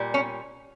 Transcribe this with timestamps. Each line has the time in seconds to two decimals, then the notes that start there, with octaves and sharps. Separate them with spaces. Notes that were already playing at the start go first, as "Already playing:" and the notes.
Already playing: A#2 G3
0.14 C#4